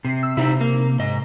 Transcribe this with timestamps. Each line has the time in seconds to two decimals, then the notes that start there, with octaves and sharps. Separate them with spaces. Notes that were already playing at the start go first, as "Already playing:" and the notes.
0.05 C3 C7
0.23 E6
0.37 C3 C4 D#4 E4
0.61 A#3
0.99 G#2 D#5